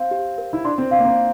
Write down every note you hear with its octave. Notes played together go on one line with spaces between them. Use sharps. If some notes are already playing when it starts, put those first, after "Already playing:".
Already playing: C4 F5
G4
A#4
E4
D4 C6
C4
C4 F5
A#3
C4